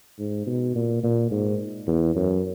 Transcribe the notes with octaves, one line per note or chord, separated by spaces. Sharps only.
G#2
B2
A#2
A#2
G#2
E2
F#2